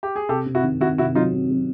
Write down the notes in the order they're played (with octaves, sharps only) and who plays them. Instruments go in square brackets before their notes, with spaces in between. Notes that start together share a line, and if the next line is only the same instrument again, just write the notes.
[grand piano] G4
G#4
[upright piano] C3 [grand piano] G4 A4
[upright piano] C3
[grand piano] E4 F#4
[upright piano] D#3
[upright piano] D#3 [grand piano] E4 F#4
[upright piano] C3 [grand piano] E4 F#4
[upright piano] F#3 [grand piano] D#4 F4
[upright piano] C3
F#3